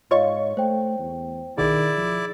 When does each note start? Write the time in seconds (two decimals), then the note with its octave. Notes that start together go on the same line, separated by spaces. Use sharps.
0.11 G#2 F4 C#5 D#5 F5 C#6
0.57 A3 C5 G5
0.99 E2
1.58 B1 B2 D#3 E4 G#4 D5
1.98 F3